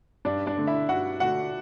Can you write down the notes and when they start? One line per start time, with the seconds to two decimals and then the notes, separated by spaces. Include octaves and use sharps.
0.25 G2 D4 D5
0.46 D4 D5
0.57 D3 A3
0.67 E4 E5
0.89 G2 F#4 F#5
1.20 D3 A3 F#4 F#5